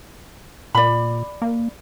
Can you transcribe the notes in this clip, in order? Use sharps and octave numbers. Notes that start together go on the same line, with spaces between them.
A#2 D5 B5
A#3